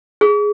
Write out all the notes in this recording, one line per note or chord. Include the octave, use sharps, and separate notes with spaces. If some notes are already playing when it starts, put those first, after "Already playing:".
G#4